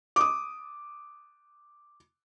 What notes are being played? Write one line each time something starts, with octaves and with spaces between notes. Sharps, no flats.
D6 D#6